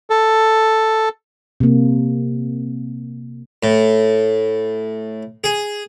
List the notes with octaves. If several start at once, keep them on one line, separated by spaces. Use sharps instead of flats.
A4
C3 A#3
A2
G#4